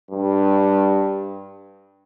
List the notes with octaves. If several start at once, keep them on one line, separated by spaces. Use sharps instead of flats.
G2